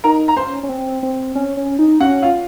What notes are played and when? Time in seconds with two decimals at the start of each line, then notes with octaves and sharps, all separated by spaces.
0.04 D#4 A#4 A#5
0.28 A#5
0.36 C#4 C5 C6
0.63 C#4
0.69 C4
1.03 C4
1.35 C#4
1.57 C#4
1.79 D#4
2.00 C#4 F#4 F#5
2.22 F4 F5